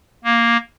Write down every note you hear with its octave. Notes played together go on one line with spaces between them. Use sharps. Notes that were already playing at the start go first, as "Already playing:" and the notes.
A#3